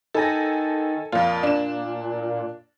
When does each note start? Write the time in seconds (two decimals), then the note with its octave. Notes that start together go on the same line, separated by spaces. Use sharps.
0.14 D#3 A4 G#5 A#6
1.12 F2 A#2 F4
1.43 D4 E7